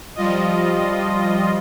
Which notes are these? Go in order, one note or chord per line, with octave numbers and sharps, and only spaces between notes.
F3 G3 F4 D#5